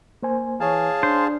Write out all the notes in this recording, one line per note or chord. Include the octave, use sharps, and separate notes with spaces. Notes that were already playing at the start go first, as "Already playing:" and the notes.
A#3 C5 G#5
E3 G#4 C#5 F5 G#5 A5
D4 C5